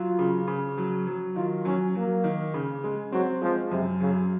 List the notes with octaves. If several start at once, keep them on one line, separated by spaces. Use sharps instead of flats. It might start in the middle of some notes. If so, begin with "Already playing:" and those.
Already playing: F#3 F4
C#3
C#3
F#3
F#3
D#3 F4
F#3 C#4
F#3 A#3
D#3
C#3
G#3
F#3 C4
F3 G#3
F#2 C3
C#3 F#3